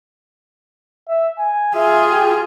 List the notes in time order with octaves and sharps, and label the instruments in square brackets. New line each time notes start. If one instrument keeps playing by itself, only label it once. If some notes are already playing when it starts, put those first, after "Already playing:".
[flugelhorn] E5
G#5
[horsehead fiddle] F4 G#4 [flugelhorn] E5
[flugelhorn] G4